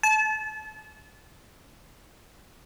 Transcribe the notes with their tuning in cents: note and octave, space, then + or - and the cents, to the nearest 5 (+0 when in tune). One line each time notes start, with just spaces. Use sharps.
A5 -35